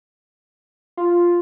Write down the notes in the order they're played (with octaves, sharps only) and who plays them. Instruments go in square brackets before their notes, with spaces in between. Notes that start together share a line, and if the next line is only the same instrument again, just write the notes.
[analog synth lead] F4